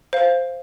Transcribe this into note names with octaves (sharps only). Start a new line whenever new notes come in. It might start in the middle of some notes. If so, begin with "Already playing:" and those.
C5 F5